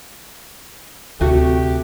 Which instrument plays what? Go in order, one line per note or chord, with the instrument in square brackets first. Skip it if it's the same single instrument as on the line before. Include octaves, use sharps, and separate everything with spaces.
[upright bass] D2 C3 [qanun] A3 F#4 [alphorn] G4